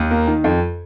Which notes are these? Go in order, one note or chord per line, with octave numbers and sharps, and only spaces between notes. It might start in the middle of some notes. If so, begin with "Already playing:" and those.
Already playing: D#2
A#3
D#3
F2